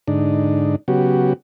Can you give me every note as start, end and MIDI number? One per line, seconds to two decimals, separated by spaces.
0.08 0.76 44
0.08 0.76 50
0.08 0.76 62
0.08 0.76 63
0.88 1.33 49
0.88 1.33 54
0.88 1.33 59
0.88 1.33 66
0.88 1.33 67